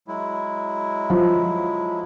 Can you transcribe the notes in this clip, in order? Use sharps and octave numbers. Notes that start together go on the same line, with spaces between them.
F#3 G#3 E4
F3